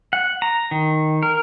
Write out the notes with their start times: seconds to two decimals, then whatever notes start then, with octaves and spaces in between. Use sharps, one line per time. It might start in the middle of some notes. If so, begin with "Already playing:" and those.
0.13 F#5
0.42 A#5
0.71 D#3
1.23 A#4